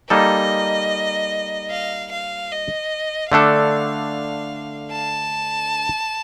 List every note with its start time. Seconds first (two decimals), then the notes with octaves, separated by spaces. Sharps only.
0.10 G3 A#3 D#4 A4 D#5
1.71 F5
2.12 F5
2.51 D#5
3.32 D3 A3 D4 A4 F5
4.92 A5